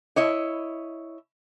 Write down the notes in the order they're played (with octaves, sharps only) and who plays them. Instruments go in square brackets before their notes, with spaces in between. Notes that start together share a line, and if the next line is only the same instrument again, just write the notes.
[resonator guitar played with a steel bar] E4 C#5 D#5